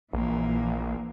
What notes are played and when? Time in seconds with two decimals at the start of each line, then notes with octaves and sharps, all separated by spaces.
0.13 A#1 E3 A#3